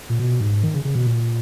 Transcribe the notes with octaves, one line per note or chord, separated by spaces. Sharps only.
A#2
B2
G#2
D#3
C#3
C#3
B2
A#2